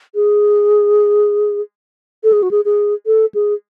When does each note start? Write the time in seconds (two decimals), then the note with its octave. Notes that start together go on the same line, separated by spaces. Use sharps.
0.15 G#4
2.24 A4
2.33 G#4
2.43 F#4
2.51 G#4
2.65 G#4
3.06 A4
3.35 G#4